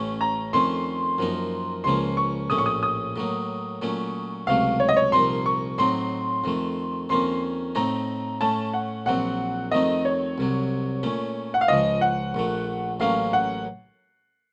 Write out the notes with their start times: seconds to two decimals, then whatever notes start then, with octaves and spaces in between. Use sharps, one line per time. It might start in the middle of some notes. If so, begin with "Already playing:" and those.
Already playing: A1 A2 A3 C#4
0.21 A#5
0.53 F2 D#3 A3 C#4 C6
1.18 F#2 F3 A#3 D#4
1.84 C#2 C#3 F3 A#3 C#4 C6
2.17 C#6
2.50 A#1 A2 A3 C#4 D#6
2.58 C#6
2.66 D#6
2.83 D#6
3.16 A2 F#3 A#3
3.82 A#2 F#3 A3 C#4
4.47 C#2 C3 F#3 A3 F5
4.80 C#5
4.89 D#5
4.97 C#5
5.12 C2 A#2 F3 A#3 D#4 C6
5.46 C#6
5.78 A2 F#3 C4 D#4 C6
6.44 F2 D#3 A3
7.09 F2 D#3 A#3 C#4 C6
7.75 A2 A3 C4 D#4 A#5
8.41 A2 A3 C#4 A5
8.74 F#5
9.06 A#1 A#2 F#3 C4 F#5
9.71 F2 D#3 A3 C4 D#4 D#5
10.05 C#5
10.38 C2 C3 F#3
11.03 A#2 A3 C#4
11.54 F#5
11.61 F5
11.68 C#2 C#3 F3 D#5
12.01 F#5
12.34 A#1 A#2 A3
13.00 A1 A2 F#3 A#3 C#4 F5
13.33 F#5